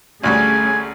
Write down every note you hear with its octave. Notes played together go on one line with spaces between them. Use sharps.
A1 D2 G3 A3 C#4 G#4 G#5